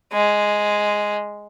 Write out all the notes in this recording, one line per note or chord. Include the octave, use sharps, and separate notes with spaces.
G#3